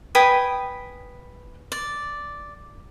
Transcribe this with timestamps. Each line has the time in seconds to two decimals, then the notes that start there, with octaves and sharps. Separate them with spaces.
0.15 B4 G5 G#5 D#6
1.72 D5